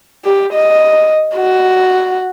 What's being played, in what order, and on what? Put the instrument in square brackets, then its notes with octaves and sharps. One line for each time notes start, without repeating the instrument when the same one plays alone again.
[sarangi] G4
D#5
F#4